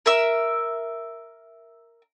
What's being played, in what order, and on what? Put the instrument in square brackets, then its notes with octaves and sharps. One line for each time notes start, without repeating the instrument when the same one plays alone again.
[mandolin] A#4 E5 E6